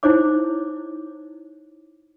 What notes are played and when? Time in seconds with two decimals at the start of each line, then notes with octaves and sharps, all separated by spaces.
0.03 D#4 E4 C5 C#5 D6